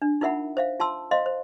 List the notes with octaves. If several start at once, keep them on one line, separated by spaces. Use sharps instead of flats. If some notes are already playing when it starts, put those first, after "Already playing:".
D4
D#4 F4 A#4 E5 F#5 B5
C5 E5 F5
F4 A5 C6 E6
C5 D#5 F5 C6
C5